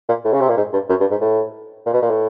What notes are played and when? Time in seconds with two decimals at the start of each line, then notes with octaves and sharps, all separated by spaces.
0.08 A#2
0.25 A2
0.33 C#3
0.41 C3
0.49 A#2
0.57 G#2
0.73 G2
0.89 F#2
1.00 G2
1.11 G#2
1.21 A2
1.86 A#2
1.94 B2
2.02 A#2
2.10 A2